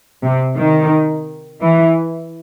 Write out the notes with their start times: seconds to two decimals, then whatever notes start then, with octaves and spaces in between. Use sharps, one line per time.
0.25 C3
0.59 D#3
1.61 E3